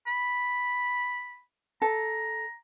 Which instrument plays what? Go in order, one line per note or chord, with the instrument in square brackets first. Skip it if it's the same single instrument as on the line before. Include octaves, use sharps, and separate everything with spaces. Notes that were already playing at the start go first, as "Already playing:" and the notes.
[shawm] B5
[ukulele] A4 [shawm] A#5